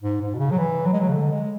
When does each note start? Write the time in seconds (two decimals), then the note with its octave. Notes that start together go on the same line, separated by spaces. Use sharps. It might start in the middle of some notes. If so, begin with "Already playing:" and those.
0.03 G#2
0.21 G#2
0.35 B2
0.39 C#3
0.51 F#3
0.58 E3
0.86 F#3
0.93 G#3
1.00 F#3
1.08 C#3
1.13 D3
1.32 G#3